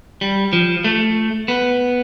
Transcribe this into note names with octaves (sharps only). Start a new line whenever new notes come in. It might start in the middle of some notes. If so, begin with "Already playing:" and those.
G3
F3
A3
B3